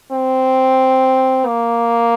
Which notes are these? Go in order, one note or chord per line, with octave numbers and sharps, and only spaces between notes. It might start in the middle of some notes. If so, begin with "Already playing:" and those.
C4
A#3